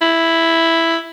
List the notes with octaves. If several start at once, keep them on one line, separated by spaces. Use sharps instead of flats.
E4